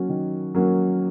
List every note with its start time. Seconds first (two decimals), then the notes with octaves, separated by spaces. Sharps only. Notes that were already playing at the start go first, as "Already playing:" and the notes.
Already playing: F#3 A#3 C#4 F#4
0.09 D#3
0.55 F#3 A#3 C#4 F#4